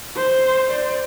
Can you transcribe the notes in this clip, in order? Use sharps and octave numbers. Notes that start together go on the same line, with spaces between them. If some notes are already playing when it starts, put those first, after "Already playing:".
C5
C5 D5